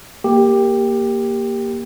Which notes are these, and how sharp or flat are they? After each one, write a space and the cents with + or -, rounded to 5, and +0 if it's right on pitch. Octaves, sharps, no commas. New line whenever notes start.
A#3 +0 G4 +10